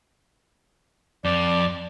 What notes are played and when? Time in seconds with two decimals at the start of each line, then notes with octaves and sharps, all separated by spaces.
1.25 F2 D5